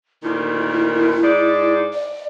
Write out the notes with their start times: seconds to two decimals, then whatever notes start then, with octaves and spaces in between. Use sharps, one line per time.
0.23 D2 A#2 D#3 E4
1.23 G#2 D5
1.93 D5